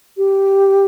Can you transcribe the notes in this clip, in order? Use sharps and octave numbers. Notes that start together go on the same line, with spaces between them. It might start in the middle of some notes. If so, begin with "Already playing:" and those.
G4